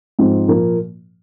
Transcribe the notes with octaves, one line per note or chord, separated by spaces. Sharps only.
G#2 F3 C4
A#2 F3 A#3